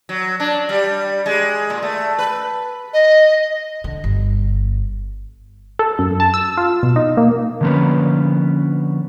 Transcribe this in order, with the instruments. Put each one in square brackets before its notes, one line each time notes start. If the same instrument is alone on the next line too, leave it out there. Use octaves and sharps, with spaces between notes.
[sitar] F#3
D4
G3
G#3
A#2
A3
B4
[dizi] D#5
[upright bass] D3
G1
[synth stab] A4
F#2
A5
E6
F4
B2
D#4
A#3
[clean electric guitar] D3 F3 A#3 B3 C#4 B4